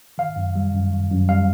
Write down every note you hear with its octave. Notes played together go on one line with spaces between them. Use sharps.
D#3 F5
F#2
G3
F#2
D#3
F#2
G3 F5